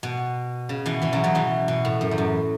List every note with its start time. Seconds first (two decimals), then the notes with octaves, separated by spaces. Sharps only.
0.03 B2
0.69 C#3
0.86 B2 E3
1.02 B2 E3
1.13 C#3 F#3
1.24 C#3 F#3
1.35 B2 E3
1.68 B2
1.85 A2
2.01 F#2
2.11 E2
2.18 F#2